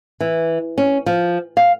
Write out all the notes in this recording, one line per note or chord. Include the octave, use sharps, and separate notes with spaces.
E3
C#4
F3
F5